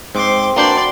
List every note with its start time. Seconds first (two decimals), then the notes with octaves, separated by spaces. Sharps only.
0.15 G#2 C4 C6 D6
0.56 A#3 D4 F#4 B4 C5 D5 C6